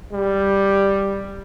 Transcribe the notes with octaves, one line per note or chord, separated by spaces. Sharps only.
G3